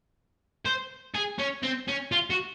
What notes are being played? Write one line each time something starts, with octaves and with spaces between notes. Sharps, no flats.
C5
G#4
C#4
C4
C#4
F4
F#4